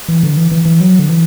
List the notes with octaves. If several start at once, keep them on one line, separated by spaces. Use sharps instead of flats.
E3
D3
E3
E3
E3
F#3
D3
E3